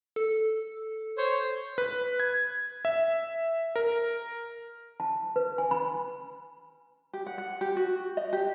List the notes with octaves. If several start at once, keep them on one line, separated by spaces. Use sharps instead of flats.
A4
C5 C#5
B4
G#6
E5
A#4
A5
B4
G#5
B5
G4
F#5
F#5
G4
F#4
D#5
G4